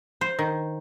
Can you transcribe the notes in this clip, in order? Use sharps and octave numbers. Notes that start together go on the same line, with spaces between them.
C5
D#3